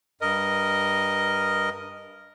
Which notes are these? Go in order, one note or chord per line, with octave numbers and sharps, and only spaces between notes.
G2 A#4 D#5